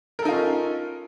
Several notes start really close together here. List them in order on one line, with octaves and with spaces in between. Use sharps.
A#4 A4 D#4 F4 C#4